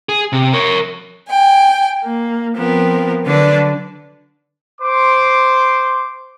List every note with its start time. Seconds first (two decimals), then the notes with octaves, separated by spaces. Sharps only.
0.09 G#4
0.33 C3
0.53 A#4 C#5
1.28 G5 G#5
2.04 A#3
2.56 F3 B3 C4 A#4
3.26 D3 F#3 D4 B4 D5
4.81 C5 C6 D6